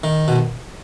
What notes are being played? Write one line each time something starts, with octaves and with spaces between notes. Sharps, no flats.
D#3
B2